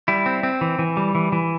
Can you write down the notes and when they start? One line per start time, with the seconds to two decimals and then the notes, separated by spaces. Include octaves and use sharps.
0.08 G3 E4
0.26 C4
0.43 C4
0.61 E3
0.79 E3
0.97 G3
1.15 E3
1.32 E3